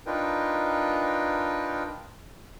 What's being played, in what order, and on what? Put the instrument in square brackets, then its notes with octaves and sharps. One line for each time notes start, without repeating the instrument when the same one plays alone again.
[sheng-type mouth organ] D4 D#4 F4 A#4 B4 G5